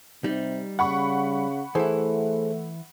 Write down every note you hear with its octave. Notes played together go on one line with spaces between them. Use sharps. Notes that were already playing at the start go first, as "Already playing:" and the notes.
C3 G3 D#4
C#3 F#5 B5 C#6
E3 A3 E4 G#4 A4 C5